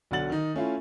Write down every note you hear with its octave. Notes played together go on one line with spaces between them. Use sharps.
B1 D3 F#3 F#5 A6 F#7
D#3 D#4
A3 C#4 E4 F4